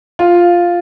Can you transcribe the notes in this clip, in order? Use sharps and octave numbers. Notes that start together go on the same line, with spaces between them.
F4